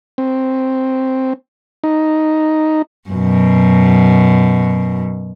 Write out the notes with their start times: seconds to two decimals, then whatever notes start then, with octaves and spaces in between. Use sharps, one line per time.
0.18 C4
1.84 D#4
3.09 F#2 B2